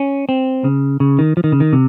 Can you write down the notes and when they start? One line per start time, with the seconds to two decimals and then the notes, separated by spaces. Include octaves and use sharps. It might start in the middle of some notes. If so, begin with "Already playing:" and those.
Already playing: C#4
0.29 C4
0.64 C#3
1.00 C#3
1.19 D#3
1.37 F3
1.44 D#3
1.52 C#3
1.60 D#3
1.73 C3